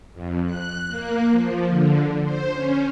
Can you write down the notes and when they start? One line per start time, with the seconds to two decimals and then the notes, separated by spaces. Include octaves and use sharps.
0.13 F2
0.44 F#6
0.88 A#3
1.30 F3
1.67 D3
2.23 C5
2.53 C#4